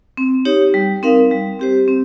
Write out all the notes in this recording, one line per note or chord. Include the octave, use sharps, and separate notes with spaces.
C4
D#4 G4 C#5
G3
C4 D#4 A#4 F5
G3
C4 G4 C5
C4